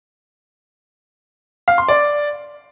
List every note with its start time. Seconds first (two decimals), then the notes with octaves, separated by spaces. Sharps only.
1.68 F5
1.78 C6
1.88 D5